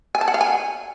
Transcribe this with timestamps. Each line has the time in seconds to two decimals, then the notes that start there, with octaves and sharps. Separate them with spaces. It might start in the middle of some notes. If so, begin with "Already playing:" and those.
0.15 G#5
0.21 A5
0.28 F#5
0.34 F5
0.41 G#5